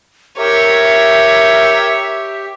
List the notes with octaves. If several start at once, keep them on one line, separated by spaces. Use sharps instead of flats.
G4 A#4 C#5 E5 G5